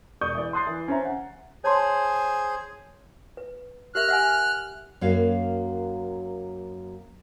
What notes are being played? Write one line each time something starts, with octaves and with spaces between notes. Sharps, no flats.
E1 D5 C#6 D#6 G6
E3 D5
C6 D#6 F#6 A6 C7
E3
C#4 C5 E5 A#5
F#5
G#4 C5 C#5 G#5 A5 C6
B4
G4 A#4 E5 F6 F#6
E5 F#5 G#5
F#2 A#3 F#4 C#5 F5